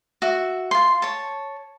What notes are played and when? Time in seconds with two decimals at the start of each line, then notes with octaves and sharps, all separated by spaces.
0.22 F#4 E5
0.71 F4 C6
1.02 C#5 A5